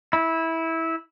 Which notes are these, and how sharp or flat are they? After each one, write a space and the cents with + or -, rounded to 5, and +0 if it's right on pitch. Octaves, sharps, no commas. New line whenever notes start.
E4 -15